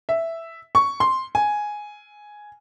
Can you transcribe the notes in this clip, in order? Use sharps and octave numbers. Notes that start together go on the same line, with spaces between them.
E5
C#6
C6
G#5